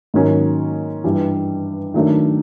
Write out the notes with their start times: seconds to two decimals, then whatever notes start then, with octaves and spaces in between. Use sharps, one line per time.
0.14 G#2 D#3 F#3 A#3 C#4
1.04 G2 E3 G3
1.94 D#3 F#3 A3 D4